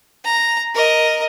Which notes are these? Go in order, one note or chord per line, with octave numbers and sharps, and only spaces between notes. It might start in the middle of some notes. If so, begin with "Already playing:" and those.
A#5
A#4 D#5